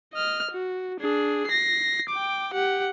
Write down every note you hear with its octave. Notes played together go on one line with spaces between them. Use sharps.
D#5 F6
F#4
D4 G#4
A#6 C7
G5 D6
G4 F#5